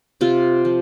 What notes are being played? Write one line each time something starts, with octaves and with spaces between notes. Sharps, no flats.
C3 F4
F3